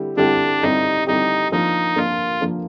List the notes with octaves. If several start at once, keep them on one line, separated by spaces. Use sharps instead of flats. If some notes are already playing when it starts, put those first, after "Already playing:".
Already playing: D3 G3 C4 E4 G4
D3 G3 C4 D4 E4 G4
D3 G3 C4 D#4 E4 G4
D3 G3 C4 D#4 E4 G4
F3 A#3 D4 D#4
F3 A#3 D4 F4
F3 A#3 D4